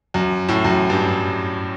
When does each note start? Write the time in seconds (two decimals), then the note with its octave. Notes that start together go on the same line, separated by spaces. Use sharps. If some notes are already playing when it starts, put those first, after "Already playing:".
0.14 F#2
0.48 A2
0.64 F#2
0.90 G2